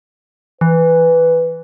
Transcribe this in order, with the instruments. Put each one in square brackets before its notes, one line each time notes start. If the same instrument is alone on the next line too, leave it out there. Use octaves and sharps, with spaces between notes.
[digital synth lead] E3 [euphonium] B4